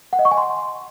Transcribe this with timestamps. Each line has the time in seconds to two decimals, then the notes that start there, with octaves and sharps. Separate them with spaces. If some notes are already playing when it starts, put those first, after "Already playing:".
0.13 F#5
0.19 D#5
0.25 C#6
0.31 G#5
0.38 C6